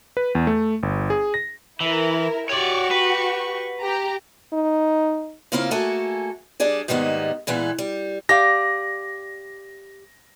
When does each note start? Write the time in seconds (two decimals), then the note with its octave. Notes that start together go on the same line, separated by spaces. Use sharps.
0.17 B4
0.35 E2
0.47 A3
0.83 G1
1.10 G#4
1.34 A#6
1.80 E3 E4 A#4
2.49 F#4 G4 C#5 D5 C#6
2.91 B4
3.79 G4 A#5
4.53 D#4
5.52 C#3 A#3 C4 E4 F4
5.71 A3 A#3 F#4 G#4 A4 G#5
6.60 G3 D4 G#4 D5
6.88 G#2 D#3 G3 G#3 A#3 B3
7.47 A#2 E3 G#3 B3
7.78 G3
8.29 G4 D5 F5 A#6